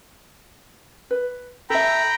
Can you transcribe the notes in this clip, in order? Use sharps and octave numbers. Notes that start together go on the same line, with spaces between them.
B4
A4 E5 G5 A#5 B5